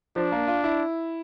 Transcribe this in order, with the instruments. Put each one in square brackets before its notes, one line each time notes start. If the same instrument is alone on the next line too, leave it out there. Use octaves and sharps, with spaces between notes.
[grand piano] F3 [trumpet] D4
[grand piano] A#3
F4
E4